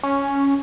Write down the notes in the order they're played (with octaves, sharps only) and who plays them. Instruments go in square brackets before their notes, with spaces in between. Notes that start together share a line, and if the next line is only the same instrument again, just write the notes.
[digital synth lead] C#4